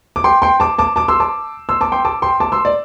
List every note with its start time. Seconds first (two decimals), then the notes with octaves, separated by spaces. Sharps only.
0.16 D6
0.24 G5 C6
0.42 G5 C6
0.60 A5 D6
0.78 A5 D6
0.96 A5 D6
1.08 C6 E6
1.20 A5 D6
1.69 C6 E6
1.81 A5 D6
1.92 G5 C6
2.05 A5 D6
2.22 G5 C6
2.40 A5 D6
2.52 C6 E6
2.65 D5